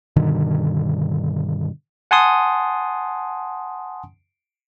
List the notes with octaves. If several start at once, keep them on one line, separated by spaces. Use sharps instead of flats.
G2 B2 D3 D#3
F#5 G#5 A5 C6 D#6